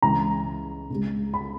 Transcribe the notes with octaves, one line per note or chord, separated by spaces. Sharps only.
C#2 C#3 E3 G#3 A#5
C#2 C#3 G#3
B5